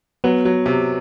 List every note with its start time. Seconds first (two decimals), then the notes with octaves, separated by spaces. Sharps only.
0.24 F#3 B3
0.45 F#3
0.66 C3